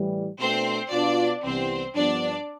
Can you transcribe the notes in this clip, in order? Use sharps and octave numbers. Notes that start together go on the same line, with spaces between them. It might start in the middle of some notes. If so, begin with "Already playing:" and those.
Already playing: A2 E3 G3
B2 A3 C4 D4 C5
B2 B3 D4 F4 D5
C2 C3 E3 G3 B3 C4 C5
G2 F3 B3 D4 D5